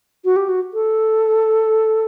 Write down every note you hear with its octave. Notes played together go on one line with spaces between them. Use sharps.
F#4
G4
F#4
A4